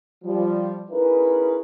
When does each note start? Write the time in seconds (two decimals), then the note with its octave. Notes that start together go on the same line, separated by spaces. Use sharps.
0.24 F3 G3
0.91 C#4 D#4 E4 G#4 A#4 B4